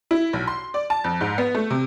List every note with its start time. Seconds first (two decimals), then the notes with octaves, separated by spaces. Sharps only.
0.11 E4
0.33 B1
0.48 C6
0.74 D5
0.90 A5
1.04 F2
1.21 G#2
1.38 B3
1.55 A3
1.70 C3